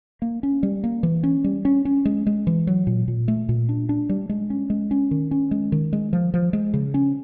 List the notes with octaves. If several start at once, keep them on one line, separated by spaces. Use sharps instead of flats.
A#3
C#4
G3
A#3
E3
C#4
G3
C#4
C#4
G#3
G#3
E3
F#3
A#2
A#2
A3
A#2
D4
D4
G3
G#3
C#4
G#3
C#4
D#3
C#4
G#3
D#3
G#3
F3
F3
G#3
C#3
C#4